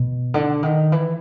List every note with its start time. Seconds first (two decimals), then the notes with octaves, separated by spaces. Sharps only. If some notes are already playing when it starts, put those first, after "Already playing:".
Already playing: B2
0.34 D3
0.63 D#3
0.92 E3